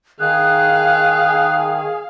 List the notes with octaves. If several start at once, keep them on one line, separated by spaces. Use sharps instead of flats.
D#3 G#4 F5 F#6